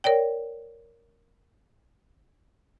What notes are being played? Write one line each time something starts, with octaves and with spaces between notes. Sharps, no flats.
A#4 C#5 D5 G5